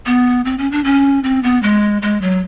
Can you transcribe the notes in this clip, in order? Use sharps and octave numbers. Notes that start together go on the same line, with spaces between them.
B3
C4
C#4
D4
C#4
C4
B3
G#3
G#3
F#3